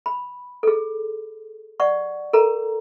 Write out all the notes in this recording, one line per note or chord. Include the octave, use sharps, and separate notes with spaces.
B5
G#4 A4
D5 F#5 C#6
A4 A#4 A#5